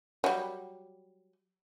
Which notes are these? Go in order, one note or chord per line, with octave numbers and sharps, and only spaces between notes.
F#3 G3